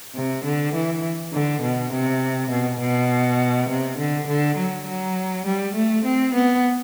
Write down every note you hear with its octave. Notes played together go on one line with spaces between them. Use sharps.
C3
D3
E3
D3
B2
C3
B2
B2
C3
D3
D3
F#3
F#3
G3
A3
C4
B3